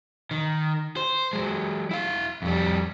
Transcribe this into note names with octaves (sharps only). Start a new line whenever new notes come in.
D#3
C5
F#3 G#3
E4 F5
F2 G3